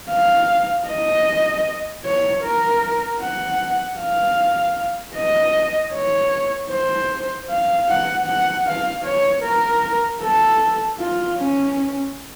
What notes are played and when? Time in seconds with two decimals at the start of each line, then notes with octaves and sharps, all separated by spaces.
0.10 F5
0.87 D#5
2.05 C#5
2.43 A#4
3.22 F#5
3.99 F5
5.15 D#5
5.93 C#5
6.71 C5
7.49 F5
7.88 F#5
8.26 F#5
8.66 F5
9.04 C#5
9.43 A#4
10.22 A4
10.99 F4
11.38 C#4